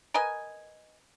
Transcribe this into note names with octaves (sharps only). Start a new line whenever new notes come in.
A#4 B4 D#5 G#5